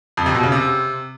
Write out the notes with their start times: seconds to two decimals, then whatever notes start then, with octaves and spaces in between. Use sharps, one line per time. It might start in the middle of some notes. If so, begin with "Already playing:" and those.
0.17 F2
0.26 C3
0.35 B2
0.43 C#3
0.52 C3